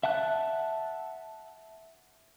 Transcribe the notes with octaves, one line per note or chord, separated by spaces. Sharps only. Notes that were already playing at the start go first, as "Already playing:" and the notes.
E5 F#5 A5 F#6